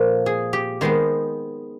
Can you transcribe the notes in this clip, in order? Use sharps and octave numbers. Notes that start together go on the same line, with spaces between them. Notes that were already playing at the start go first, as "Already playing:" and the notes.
Already playing: A#2 F3 A#3 A4
G#4
G4
D#3 G#3 B3 C5